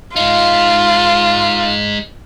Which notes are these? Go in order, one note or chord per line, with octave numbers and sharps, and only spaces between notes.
G#3 D#4 F4